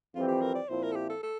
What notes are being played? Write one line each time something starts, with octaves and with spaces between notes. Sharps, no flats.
F2 E3 G3 C4 F4
G4
A#4
D5
A#2 F3 C4 E4 C5
A#4
A4
G4
A4
A4